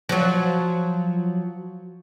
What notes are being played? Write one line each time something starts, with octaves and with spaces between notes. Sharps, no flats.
F3 F#3